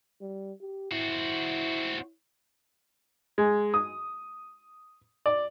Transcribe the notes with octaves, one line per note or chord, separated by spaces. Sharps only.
G3
G4
C4 E4 F#4
G#3
D#6
D5